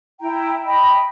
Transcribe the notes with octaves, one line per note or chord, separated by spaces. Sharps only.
E4 G5 A#5
D#5 G5 B5